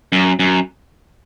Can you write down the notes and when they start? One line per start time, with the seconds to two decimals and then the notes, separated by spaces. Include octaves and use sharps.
0.12 F#2
0.39 F#2